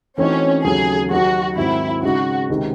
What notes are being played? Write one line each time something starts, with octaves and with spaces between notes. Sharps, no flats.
E3 A3 C4 C#4 D#4 F#4
D#2 C#3 F#3 A3 G#4
D#2 D#3 F#3 F#4
G#2 D#3 F#3 C4 E4
C#3 G#3 D#4 F#4
C#2 C3 D#3 G#3